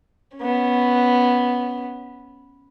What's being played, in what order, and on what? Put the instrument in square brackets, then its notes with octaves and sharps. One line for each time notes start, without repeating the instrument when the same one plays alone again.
[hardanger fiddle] B3 C#4